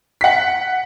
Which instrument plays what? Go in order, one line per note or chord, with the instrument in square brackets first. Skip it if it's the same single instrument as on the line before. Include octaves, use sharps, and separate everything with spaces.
[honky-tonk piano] F#5 B6